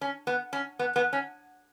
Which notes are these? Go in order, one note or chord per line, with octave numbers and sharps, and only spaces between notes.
C#4
B3
C#4
B3
B3
C#4